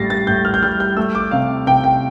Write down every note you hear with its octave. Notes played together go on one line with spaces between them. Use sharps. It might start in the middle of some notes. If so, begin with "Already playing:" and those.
Already playing: A2 G3 A6 A#6 C7
A6
A2 G6
F6
G6
G3 F6
G6
A3 E6
D6
C3 F5
C3 G5
G5